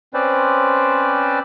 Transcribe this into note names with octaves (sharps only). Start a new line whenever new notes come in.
C4 C#4 B4 C5 D5